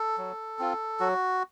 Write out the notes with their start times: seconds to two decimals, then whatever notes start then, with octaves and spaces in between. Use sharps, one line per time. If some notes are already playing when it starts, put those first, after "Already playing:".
Already playing: A4
0.18 F#3
0.59 C4 F4
1.00 F#3 F#4